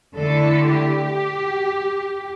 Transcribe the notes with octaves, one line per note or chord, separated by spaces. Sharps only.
D3 A3 E4 A4
G4